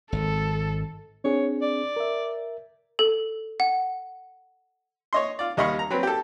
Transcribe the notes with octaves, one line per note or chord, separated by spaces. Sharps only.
G#1 A4
C4 D4 G#4 C#5
D5
A#4 E5
A4
F#5
C#5 D#5 C6
F4 D5
D#2 G3 D#5 F5 B5 C#6
A#5
F#3 C4 B4
G4 A4